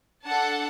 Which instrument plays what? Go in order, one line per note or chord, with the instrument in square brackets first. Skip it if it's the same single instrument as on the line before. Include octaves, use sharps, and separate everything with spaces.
[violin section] D4 A4 F#5 A5